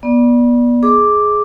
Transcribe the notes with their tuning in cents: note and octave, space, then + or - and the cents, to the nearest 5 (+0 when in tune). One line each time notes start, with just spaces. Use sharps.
B3 -30 D5 +0
G#4 +15 D#5 +10 D6 +0